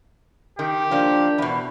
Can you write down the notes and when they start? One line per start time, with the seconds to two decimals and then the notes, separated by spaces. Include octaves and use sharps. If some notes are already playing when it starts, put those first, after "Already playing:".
0.59 D#3 G4
0.91 F3 A#3 D4
1.38 E2 B2